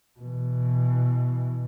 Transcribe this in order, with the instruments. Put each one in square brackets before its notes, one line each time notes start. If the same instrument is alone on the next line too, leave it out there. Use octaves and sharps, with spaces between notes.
[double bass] B2 E3